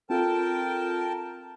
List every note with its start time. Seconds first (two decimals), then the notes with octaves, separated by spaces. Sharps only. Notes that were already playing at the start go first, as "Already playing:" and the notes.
0.10 C4 F4 A4 A#4 G5 A5